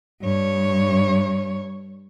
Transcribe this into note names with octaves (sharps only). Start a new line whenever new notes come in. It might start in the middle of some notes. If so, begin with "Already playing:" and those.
G2 C#5